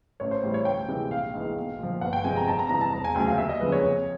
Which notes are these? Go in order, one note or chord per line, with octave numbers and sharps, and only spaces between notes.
A1 C#5
C5
A2 E3 G3
C#5
D2 G5
C3 E3 G#3
A#1 F5
G#2 E3
B1
A#2 F3
G1 F#5
G5
F2 C3 F3 G#3 G#5
A#5
F2 A5
A#5
C3 E3 G3 A#5
A5
E1 A#5
G#5
D2 C#3 F#3 G5
F5
D#2 E5
D#5
C#3 F3 G#3 B4
C#5
F2